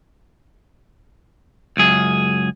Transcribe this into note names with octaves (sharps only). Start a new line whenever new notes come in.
C#2 F#2 G#4